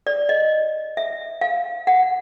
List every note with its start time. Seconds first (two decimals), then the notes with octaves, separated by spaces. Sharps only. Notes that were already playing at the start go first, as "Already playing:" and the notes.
0.07 D5
0.29 D#5
0.97 E5
1.41 F5
1.87 F#5